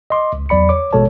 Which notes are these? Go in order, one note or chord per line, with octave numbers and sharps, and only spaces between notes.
D#5 C6 D6
C#2
E2 F#3 D5 B5 C#7
C#5 D6
A1 B2 G#3 A4 C#5 A5